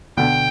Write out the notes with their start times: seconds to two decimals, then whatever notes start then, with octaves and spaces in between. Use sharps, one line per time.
0.17 B2 D3 G5